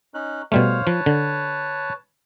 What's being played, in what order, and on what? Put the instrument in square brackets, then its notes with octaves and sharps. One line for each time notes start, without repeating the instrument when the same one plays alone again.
[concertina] C#4 D#4 F#6
[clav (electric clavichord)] B2 G3 A3 [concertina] C5 C#5 F5
[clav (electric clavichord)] F3 [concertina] B4 C#5 A5
[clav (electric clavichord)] D3